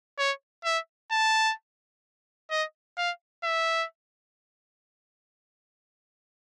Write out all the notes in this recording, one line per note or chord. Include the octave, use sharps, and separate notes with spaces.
C#5
E5
A5
D#5
F5
E5